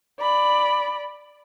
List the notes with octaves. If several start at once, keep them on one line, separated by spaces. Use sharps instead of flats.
D5 B5